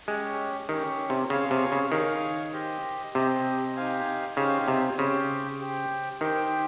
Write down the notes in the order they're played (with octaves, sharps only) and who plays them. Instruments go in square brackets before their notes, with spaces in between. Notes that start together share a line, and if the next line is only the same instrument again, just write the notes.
[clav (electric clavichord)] G#3 [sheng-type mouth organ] C#4 G4 C#5
[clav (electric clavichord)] D#3 [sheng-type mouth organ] C#4 G4 C#5
[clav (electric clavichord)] C3
[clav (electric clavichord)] C#3 [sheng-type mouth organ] G#4 C#5 F5 G#5
[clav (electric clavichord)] C3
C#3
[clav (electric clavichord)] D#3 [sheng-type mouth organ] G#4 C#5 F5 G#5
[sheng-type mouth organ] G4 C5 D#5
[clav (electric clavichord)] C3 [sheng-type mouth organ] G4 C5 D#5
[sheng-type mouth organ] D#4 G4 C5 F5 G#5
[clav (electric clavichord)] C#3 [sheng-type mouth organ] D#4 G4 C5 F5 G#5
[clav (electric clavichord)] C3
[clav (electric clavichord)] C#3 [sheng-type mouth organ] G4 C5 G5
[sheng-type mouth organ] G4 C5 G5
[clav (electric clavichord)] D#3 [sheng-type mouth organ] G4 C5 G5